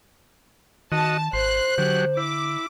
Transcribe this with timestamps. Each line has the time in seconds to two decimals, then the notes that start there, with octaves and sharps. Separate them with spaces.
0.92 D#3 F#4 D#5 A5
1.33 G#1 C5 C6 F#6
1.78 D3 F#3 G4
2.17 E4 D6